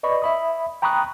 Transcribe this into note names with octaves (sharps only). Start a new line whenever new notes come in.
B4 D5 D#5 B5 C#6
E5 B5 D#6
G5 A#5 B5 C#6 D#6 F#6